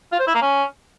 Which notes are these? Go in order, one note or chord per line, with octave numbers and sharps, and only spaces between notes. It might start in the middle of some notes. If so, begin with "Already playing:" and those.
F4
C5
E4
A#3
C#4